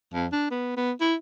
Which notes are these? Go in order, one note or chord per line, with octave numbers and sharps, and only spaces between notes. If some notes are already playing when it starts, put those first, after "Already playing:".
F2
D4
B3
B3
E4